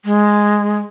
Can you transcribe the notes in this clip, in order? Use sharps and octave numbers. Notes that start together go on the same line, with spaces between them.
G#3